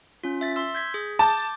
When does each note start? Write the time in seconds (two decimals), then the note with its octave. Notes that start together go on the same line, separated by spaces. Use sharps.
0.24 C#4 F4
0.41 E5 A6 B6
0.56 C6 E6
0.75 G6 G#6 B6
0.94 G#4
1.19 A5 D6 G6 A6